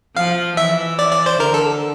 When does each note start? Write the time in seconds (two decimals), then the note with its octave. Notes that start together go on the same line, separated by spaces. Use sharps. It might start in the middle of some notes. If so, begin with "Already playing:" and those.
0.16 F3 F5
0.57 E3 E5
0.99 D5
1.12 D5
1.26 C5
1.40 D3 A#4
1.54 A4